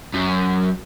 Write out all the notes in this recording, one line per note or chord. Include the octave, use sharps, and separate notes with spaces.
F#2